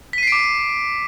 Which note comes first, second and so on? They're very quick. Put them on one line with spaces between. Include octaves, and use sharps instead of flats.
B6 D#7 C7 D7 D6